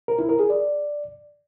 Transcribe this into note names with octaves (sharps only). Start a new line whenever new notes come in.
A#4
E4
A#4
G#4
D5